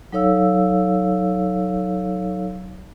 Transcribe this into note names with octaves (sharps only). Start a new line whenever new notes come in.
F#3 D#4 A4 C#5 F5 E6